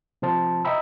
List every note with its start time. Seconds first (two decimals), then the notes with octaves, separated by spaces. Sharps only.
0.22 C3 F3 C5 A5
0.65 D#5 E5 G5 A#5 B5 E6